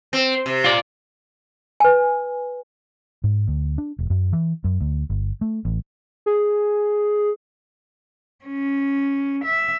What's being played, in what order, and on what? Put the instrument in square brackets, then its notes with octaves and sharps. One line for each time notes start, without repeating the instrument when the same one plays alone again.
[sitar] C4
C3
[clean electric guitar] F4 D5
[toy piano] B4 G#5
[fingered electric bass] G#2
D2
D4
E1
F#2
E3
F#2
D2
G1
A3
A1
[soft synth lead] G#4
[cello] C#4
E5